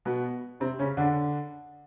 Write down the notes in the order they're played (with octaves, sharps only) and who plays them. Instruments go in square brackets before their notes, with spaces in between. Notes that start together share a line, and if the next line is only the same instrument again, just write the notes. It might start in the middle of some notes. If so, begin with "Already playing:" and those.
[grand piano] B2 B3
C3 C4
C#3 C#4
D3 D4